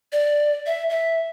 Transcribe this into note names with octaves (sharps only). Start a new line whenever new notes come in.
D5
E5
E5